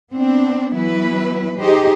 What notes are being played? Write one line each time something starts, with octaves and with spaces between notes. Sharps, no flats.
B3 C4 D4
E3 F#3 B3 E4 B4
D#4 G4 G#4 C5 D#5